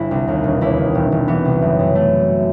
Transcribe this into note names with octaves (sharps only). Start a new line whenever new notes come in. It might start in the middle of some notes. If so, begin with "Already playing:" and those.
Already playing: G1 E4
C2
D#2
E1
D#2 E4
D#3
E1
E1
E3 B3
C2
F#1
F#2
A3